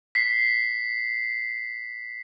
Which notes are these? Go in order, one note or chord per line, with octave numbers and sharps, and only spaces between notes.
B6 C7